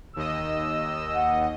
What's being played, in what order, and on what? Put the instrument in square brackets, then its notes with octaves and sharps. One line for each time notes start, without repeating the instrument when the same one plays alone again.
[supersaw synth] D#2 D#5 [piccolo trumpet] E6
[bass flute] F#5